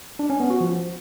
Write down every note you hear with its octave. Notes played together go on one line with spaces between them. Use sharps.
D4
C#4
B3
F#4
F3